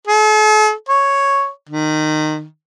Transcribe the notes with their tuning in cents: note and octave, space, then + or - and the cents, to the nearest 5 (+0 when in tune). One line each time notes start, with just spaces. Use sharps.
A4 -45
C#5 +0
D#3 -20